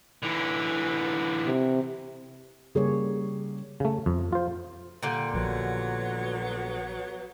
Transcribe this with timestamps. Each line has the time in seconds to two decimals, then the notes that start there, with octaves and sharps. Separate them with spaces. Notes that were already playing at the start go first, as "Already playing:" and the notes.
0.23 D3 E3
1.46 C3
2.75 C#3 G3 A#3 G#4 C#5
3.80 C#3 A3
4.06 F2
4.32 F4 C5
5.03 A#2 D3 G3
5.33 A#1 F3 F#3 B3